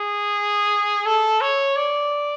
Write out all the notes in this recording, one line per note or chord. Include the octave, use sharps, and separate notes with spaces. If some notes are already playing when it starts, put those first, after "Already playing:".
Already playing: G#4
A4
C#5
D5